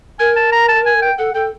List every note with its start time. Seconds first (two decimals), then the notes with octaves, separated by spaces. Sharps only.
0.20 A#4 G#5
0.36 A5
0.52 A#5
0.69 A5
0.86 G#5
1.02 G5
1.18 A4 F#5
1.34 A4 G5